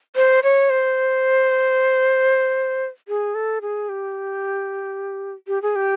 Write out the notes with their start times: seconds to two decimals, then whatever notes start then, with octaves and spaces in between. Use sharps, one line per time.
0.16 C5
0.43 C#5
0.70 C5
3.08 G#4
3.35 A4
3.62 G#4
3.89 G4
5.48 G4
5.62 G#4
5.76 G4